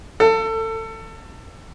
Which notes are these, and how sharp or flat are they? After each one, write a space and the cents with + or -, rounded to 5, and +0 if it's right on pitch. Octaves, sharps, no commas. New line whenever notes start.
A4 +25